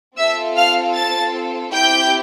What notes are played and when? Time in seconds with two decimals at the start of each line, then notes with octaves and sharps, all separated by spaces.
0.17 C4 F4 A4 E5 E6
0.56 F5 F6
0.95 A5 A6
1.73 C4 E4 G4 G5 G6